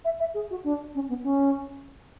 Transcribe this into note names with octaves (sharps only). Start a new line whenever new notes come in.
E5
E5
G#4
F#4
D4
C#4
B3
C#4